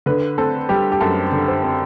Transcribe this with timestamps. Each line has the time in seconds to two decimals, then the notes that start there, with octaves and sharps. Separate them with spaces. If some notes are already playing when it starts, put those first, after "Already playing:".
0.06 D3 B4
0.38 C4 A4
0.69 G3 G4
0.92 G4
1.00 F#2 A4
1.32 D3
1.48 C5
1.63 C4